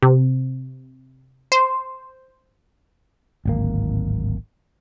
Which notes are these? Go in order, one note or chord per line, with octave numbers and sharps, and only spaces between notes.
C3
C5
D1 G#1 A#3